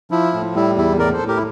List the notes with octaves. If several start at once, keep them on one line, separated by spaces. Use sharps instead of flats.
F3 E4
A2
G3 E4
E2 E4
A2 A#4 D5
A4 C5
A2
G4 A#4
E4